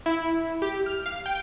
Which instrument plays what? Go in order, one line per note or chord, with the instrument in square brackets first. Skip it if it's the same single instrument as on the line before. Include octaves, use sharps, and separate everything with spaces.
[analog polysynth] E4
G4
F6
F5
G5